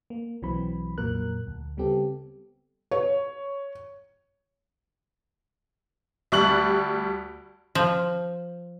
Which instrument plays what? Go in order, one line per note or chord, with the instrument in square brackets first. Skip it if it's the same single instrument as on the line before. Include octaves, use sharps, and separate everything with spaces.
[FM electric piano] A#3
B1 E3 F#3 C4 B5
F2 A#2 F#3 A#3 A#4 F#6
D2
C#3 G3 B3 C4 G4 A4
[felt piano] C#5
[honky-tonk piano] D2 G3 C#6 F#6 F#7
[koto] F3